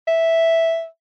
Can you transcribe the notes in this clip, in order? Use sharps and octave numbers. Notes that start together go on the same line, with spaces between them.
E5